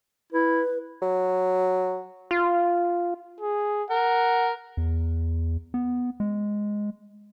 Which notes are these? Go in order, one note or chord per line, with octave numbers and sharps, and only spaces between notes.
E4 B4
F#3
F4
G#4
A#4 F#5
E2
B3
G#3